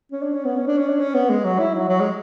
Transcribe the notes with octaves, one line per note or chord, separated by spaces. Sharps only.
C#4
D4
C#4
B3
C#4
D4
C#4
D4
C#4
B3
G#3
F#3
E4
F#3
F#3
G#3